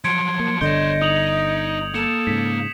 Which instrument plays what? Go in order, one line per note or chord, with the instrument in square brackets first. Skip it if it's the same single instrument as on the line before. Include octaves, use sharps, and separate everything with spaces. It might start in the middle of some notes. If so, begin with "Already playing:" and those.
[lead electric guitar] F3 F#3 [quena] C6 [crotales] G#6 C#7 D7
[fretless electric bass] A#3
[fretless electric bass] G1 D3 [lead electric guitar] C#5 C6 [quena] D#5 [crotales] G6
[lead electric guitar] D#4 [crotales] D#6 F7 F#7
[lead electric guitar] A#3 [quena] A4 [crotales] C#7 E7
[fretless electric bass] G#2 C#3 [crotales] B6